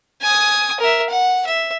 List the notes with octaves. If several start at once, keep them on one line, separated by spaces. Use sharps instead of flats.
G#5 D#6
A#4 E5
F#5
E5